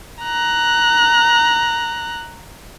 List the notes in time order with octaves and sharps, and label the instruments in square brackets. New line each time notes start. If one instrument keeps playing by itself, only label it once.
[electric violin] A#5 F#6